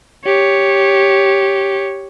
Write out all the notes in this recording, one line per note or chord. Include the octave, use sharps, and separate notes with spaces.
G4 C#5